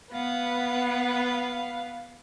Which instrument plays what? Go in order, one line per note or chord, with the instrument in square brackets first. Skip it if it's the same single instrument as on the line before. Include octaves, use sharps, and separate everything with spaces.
[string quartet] B3 B4 F#5 [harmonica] F5